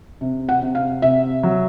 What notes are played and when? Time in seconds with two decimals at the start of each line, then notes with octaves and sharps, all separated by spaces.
0.21 C3
0.49 F#5
0.62 C3
0.75 F5
1.02 C3 E5
1.43 F#3